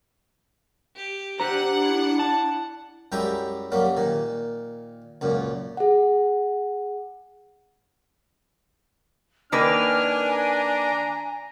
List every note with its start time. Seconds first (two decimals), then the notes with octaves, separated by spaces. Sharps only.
0.95 G4
1.40 D4 G4 C5 F#5 A#5
1.82 E4
2.19 A5
3.12 F#2 G3 G#3 E4 G5 A#5
3.72 F#2 F#3 G3 A#3
3.97 A#2 D#3
5.21 C#2 F#2 A#2
5.77 G#4 F#5
9.52 D#3 A#3 D4 B4 G#5 F6
10.30 A#5